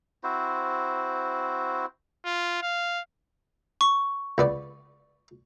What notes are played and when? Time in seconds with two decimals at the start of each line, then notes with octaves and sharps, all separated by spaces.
0.23 C4 E4 F#4 C5
2.26 F4
2.62 F5
3.81 C#6
4.38 C#2 B3 D5